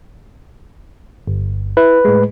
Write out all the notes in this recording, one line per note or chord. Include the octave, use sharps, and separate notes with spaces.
G1
E4 B4
A2 G#3